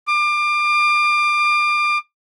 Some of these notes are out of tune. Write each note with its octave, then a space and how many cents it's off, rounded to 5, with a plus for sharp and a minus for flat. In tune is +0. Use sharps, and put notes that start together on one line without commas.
D6 +30